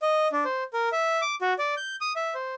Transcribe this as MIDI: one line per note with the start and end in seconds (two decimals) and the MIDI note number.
0.02 0.28 75
0.32 0.44 62
0.45 0.64 72
0.73 0.89 70
0.92 1.21 76
1.22 1.35 86
1.41 1.53 66
1.59 1.75 74
1.77 1.96 91
2.01 2.13 87
2.16 2.34 76
2.35 2.55 72